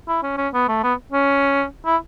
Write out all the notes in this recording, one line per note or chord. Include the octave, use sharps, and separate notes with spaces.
E4
C#4
C#4
B3
A3
B3
C#4
E4